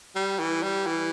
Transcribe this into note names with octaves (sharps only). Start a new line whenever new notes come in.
G3
E3
G3
E3